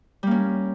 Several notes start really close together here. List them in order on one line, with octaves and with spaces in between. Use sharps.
G3 A#3 C#4